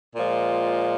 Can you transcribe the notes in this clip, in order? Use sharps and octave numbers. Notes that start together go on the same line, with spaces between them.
A#2 F3 G#3